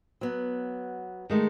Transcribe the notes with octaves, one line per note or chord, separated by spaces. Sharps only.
F#3 B3
D#3 G#3 A3